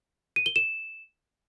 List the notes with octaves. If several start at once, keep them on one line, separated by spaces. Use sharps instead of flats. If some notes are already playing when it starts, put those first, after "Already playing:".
D#7
G7
E7